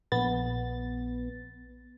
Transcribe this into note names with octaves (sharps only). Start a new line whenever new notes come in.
A#1 B3 A6